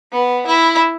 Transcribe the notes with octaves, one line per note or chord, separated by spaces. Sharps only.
B3
E4